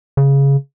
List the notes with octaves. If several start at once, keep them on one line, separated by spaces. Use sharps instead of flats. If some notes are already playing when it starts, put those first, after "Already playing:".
C#3